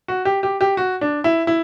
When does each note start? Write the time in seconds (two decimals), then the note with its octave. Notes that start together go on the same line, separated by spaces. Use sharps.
0.08 F#4
0.25 G4
0.43 G4
0.61 G4
0.77 F#4
1.01 D4
1.24 E4
1.47 E4